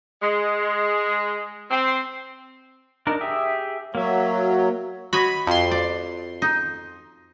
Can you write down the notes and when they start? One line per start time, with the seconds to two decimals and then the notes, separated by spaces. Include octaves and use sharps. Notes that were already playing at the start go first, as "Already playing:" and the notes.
0.22 G#3
1.71 C4
3.07 D4 D#4 A#4
3.21 G4 G#4 E5
3.95 F#3 A#3 E5
5.13 F#4 C#5 D#5 B5
5.47 F2 C6
5.71 D5
6.42 D#4